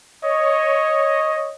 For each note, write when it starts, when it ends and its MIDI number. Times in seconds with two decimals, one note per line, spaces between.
0.24 1.56 73
0.24 1.56 75